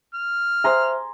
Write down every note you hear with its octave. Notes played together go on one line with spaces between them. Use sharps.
F6
G#4 C5 E5 A#5 C6